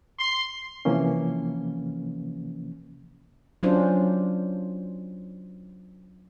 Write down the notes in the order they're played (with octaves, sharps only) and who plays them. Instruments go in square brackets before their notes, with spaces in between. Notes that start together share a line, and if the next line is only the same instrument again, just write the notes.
[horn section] C6
[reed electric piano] C3 E3 F3 A#3 C#4
[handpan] F#3 C#4 D4 F4 C5